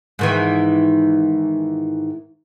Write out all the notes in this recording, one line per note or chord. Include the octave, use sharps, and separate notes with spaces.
G#2 D#3 E3